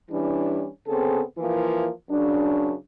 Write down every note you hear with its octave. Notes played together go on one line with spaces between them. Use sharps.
E3 G3 C#4 D4 E4
C#3 B3 C4 G#4 A4
E3 F3 A#3 E4
F#2 C#3 D4